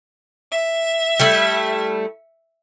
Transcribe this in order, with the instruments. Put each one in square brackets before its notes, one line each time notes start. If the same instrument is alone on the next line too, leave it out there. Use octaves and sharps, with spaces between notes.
[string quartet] E5
[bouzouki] G3 A3 E4